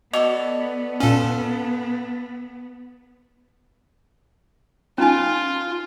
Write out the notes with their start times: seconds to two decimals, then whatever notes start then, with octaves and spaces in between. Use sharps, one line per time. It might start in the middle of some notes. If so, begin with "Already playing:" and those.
0.13 B3 F#4 A4 D5 D#5 D6 F7
1.00 A#2 C#4 F4 A4
4.98 C#4 D#4 F4 G#5